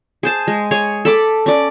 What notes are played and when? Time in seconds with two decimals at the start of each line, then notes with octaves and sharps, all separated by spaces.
0.23 G#4 C5 A5
0.48 G#3
0.71 G#4 C#5
1.05 A4 B5 D6
1.46 C#4 D5